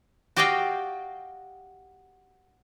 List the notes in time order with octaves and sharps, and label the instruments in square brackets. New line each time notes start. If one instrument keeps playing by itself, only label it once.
[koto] F#4 G4 D5 D#5 F5 G5